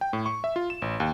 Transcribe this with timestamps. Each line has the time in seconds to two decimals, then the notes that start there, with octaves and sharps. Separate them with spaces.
0.01 G5
0.13 A2
0.26 C#6
0.44 E5
0.56 F4
0.70 E7
0.82 A1
1.00 D#2